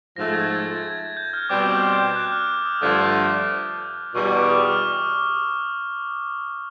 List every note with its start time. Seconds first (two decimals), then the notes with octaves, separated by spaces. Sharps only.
0.16 G#2 F3 A3 A#6
0.33 G#6
0.44 A6
0.50 G#6
0.66 A6
0.83 G#6
0.99 G#6
1.17 G6
1.33 F6
1.49 B2 G3 C4 D6
1.71 D6
1.93 G6
2.16 F#6
2.32 F6
2.65 D#6
2.82 G2 D3 F3 A3
4.15 E2 B2 G3 C#6
4.37 D6
4.49 D#6
4.65 F6